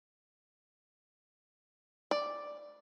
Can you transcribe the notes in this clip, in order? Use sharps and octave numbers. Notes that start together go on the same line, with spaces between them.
D5